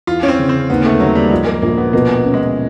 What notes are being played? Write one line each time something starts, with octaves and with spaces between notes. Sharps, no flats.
E2 F4
C#4
C4
C#3
C4
D#2 B3
A3
D#2 F#3
G3
F3 G#3
A#3
A#1 A#3
B3
B2 A#3
C#4
G#3